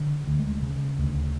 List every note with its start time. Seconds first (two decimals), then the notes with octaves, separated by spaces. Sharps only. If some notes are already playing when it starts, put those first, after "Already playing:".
Already playing: D3
0.27 D2
0.39 G#3
0.62 C#3
0.98 D2